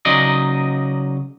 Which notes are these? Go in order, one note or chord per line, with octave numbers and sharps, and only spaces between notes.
C#3 F#3 D#4 D5 D#5